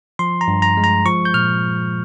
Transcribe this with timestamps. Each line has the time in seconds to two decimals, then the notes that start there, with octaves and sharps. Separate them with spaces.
0.19 F3 C6
0.41 A#5
0.48 G2
0.62 A#5
0.77 G#3
0.84 A#5
1.06 F3 C#6
1.25 G6
1.34 A#2 F6